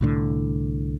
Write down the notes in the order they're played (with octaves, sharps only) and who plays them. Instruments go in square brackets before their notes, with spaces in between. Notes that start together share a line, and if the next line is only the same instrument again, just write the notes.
[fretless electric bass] C2 A2 D3